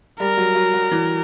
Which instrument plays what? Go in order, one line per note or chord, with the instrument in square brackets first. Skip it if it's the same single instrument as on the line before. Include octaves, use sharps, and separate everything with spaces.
[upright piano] G3 [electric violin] A#4
[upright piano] F#3
F#3
F#3
E3